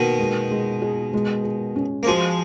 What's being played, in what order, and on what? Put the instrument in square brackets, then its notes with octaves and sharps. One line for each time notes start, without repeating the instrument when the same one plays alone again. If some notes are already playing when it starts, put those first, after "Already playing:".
Already playing: [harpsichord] B2 D#3 [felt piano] A#3
[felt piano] G#3
G#3
G#4
G#3
G#4
C#4
[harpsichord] A#3
[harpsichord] F3 G#3 [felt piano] F#4